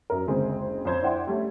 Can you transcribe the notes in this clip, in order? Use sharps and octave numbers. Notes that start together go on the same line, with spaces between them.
F#2 A#4
F#1 D2 G#3 C4 G#4
F2 C5 G#6
D4 E4 C5 F#5 G5 C6
G3 A3 C#4